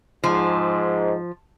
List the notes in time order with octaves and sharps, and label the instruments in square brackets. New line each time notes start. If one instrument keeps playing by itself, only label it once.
[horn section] G#2 [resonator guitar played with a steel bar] F3